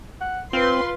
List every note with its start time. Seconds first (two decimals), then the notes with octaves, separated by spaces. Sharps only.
0.21 F#5
0.53 C4 F4 B4 C6